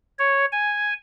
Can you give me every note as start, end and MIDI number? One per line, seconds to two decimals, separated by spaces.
0.19 0.45 73
0.52 0.93 80